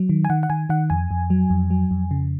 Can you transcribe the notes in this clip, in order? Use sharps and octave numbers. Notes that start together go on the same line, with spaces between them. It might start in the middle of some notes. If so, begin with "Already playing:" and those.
Already playing: F#3
D#3
G#5
D#3 F#5
F#5
D#3 G#5
D#3 F#5
F2 G#5
F2
F#3
F2
F#3
F2
C#3